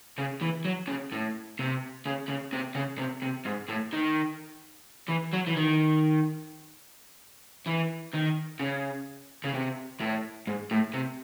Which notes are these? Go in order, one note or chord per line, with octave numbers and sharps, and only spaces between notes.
C#3
E3
F#3
C#3
A2
C3
C#3
C#3
C3
C#3
C3
C3
G#2
A2
D#3
E3
F#3
E3
D#3
E3
D#3
C#3
C#3
C3
A2
G#2
A2
C3